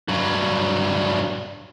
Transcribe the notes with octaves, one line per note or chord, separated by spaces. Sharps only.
G2 F#3